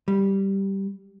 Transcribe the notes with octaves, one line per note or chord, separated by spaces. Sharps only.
G3